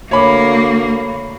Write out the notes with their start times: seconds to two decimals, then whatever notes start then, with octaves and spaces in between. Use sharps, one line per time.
0.11 D2 A#3 C#5 B5 D6